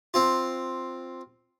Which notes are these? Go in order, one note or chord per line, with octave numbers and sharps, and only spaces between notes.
C4 F4